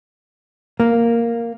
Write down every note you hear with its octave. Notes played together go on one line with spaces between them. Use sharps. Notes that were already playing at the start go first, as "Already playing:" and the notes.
A#3